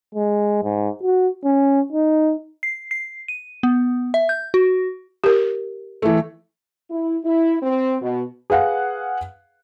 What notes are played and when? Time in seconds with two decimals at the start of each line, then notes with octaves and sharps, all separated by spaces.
0.15 G#3
0.63 G#2
1.03 F#4
1.45 C#4
1.92 D#4
2.63 C7
2.91 C7
3.28 D#7
3.63 B3
4.14 E5
4.29 G6
4.54 F#4
5.24 G4 A#4
6.02 E3 A3
6.90 E4
7.24 E4
7.62 C4
8.01 B2
8.50 G#4 B4 F5 F#5